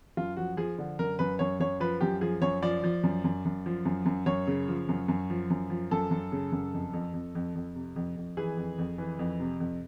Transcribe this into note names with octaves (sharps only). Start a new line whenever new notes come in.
F#2 F4
F3 F#4
F3 G#4
D3
F#2 A#4
F#2 B4
F#2 C#5
F#2 C#5
F3 B4
F#2 G4
F3 G#4
F#2 C#5
F3 D5
F3
F#2
F#2
F#2
F3
F#2
F#2
F#2 C#5
C#3
F3
F#2
F#2
F3
F#2
F3
F#2 A4
F#2
C#3
F#2
F2
F2
F2
F2
F2
C3
F2
F2
E3 G#4
F2
F2
E3
F2
C3
F2